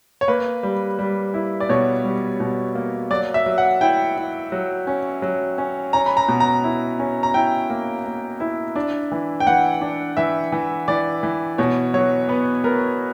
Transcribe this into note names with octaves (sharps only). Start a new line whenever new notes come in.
C#5
A#3 B4
G3
G3
E4
D5
B2 C#5
G3
B2
A#3
F#3 D5
E5
F#3
F#5
E4 G5
E4
F#3
C#4
F#3
C#4
C#4 A#5
B5
A#5
B2
A#5
E4
C#4
A#5
E4 G5
A#3
A#3
E4
D4
E3
G5
E3 F#5
D4
E3 E5
E3
E3 D5
E3
B2 C#5
F#3 C#5
B3 B4
B3 A#4